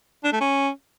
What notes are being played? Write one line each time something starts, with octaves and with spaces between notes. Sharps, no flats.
D4
A3
C#4